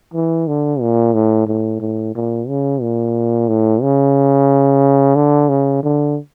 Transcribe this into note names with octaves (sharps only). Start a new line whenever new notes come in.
E3
D3
A#2
A2
A2
A2
A#2
C#3
A#2
A2
C#3
D3
C#3
D3